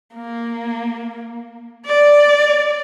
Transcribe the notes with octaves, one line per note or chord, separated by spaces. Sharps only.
A#3
D5